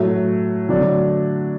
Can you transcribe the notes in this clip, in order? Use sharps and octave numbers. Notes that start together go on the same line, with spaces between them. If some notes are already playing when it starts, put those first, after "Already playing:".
Already playing: A2 F#3 A3
D3 F#3 A3 D4